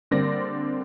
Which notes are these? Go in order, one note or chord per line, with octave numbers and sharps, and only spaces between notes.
D3 G3 A#3 C4 D5 A#6